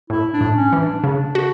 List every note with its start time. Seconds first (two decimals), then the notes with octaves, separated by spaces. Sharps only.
0.10 A2 E4
0.33 D4
0.41 A2
0.57 C#4
0.73 E3
0.81 D4
1.04 C#3 D4
1.35 F#4